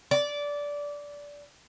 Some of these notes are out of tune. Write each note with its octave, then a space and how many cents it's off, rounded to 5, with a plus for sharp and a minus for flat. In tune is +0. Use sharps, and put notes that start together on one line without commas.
D5 -15